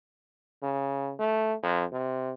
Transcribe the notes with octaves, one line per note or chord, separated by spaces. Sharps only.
C#3
A3
F2
C3